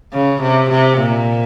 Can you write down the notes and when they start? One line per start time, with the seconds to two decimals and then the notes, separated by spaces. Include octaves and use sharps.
0.13 C#3
0.41 C3
0.69 C3
0.98 A#2